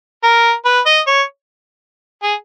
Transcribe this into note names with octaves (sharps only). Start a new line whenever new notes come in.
A#4
B4
D#5
C#5
G#4